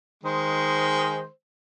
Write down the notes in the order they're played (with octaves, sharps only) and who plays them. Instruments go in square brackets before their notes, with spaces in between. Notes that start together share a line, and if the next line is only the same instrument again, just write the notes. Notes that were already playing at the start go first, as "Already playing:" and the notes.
[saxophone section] D#3 C5 [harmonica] G#3